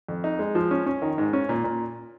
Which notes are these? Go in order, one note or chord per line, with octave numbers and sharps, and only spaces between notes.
F2
D#4
G#3
F3
C#4
C#4
D#3
G#2
C#4
A#2
A#2